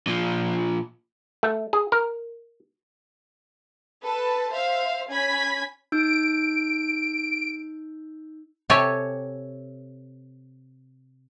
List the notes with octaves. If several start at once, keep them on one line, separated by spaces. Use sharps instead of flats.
A#2 F3
A3
G#4
A#4
A4 B4 A5
C5 E5 F5
C#4 G#5 B5 G#6 B6
D#4 E6 G6 D7
C3 G4 A4 C#5 G#5